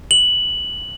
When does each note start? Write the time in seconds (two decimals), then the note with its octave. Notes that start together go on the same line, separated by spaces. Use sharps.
0.11 F#7